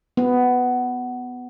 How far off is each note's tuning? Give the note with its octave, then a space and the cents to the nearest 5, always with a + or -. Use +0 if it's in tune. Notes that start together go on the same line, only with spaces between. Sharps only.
B3 +10